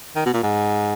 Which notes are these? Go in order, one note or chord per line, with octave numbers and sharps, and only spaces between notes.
D#3
B2
A#2
G#2